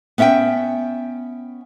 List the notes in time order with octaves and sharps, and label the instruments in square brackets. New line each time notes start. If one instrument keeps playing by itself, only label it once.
[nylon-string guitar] B3 C#4 E5 F#5 G5